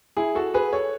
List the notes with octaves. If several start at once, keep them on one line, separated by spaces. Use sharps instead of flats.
E4 G#4
F#4 A4
G#4 B4
A4 C#5